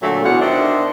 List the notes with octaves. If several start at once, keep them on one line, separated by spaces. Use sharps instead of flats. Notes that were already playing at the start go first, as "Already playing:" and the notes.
A#2 D3 F#3 A3
E2 B2 D4 F4 F#4 F#5
D#3 D4 C5 D5 E5